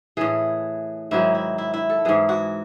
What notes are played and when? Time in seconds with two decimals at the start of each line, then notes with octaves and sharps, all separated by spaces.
0.17 A2 E3 G#4
1.11 G#2 D#3 F#3 E4
1.35 E4
1.58 E4
1.74 E4
1.89 A4
2.05 G#2 E3 G#4
2.29 F#4